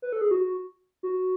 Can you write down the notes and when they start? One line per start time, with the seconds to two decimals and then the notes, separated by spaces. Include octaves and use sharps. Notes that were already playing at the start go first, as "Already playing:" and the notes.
0.02 B4
0.12 A4
0.21 G#4
0.31 F#4
1.03 F#4